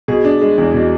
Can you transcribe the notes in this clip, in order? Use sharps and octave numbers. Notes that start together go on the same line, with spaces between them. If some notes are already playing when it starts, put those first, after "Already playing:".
B2 G#4
D4
G#3
E2
B2